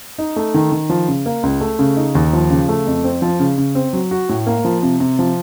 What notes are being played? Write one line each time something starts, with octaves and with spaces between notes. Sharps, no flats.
D#4
A3
D#3
D#3
F3
C#3
A#3
C#2
A3
C#3
D#4
D#2
F3
C#3
A3
F2
C4
F3
C#3
C#3
C4
F#3
F#4
A2
A#3
F3
C3
C3
F3